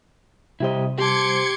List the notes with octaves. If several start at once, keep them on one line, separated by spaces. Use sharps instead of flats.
C3 G3 E4 G4 C5 D#5
G4 A5 C6 D6 G#6 C#7